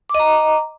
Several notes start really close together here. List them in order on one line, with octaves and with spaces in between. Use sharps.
D6 D#5 A#5